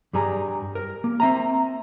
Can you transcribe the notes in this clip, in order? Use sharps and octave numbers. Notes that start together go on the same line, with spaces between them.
G2 G3 G#4 A#5
A#4
A#3
C4 E5 A#5